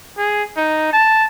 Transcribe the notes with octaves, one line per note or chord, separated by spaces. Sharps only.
G#4
D#4
A5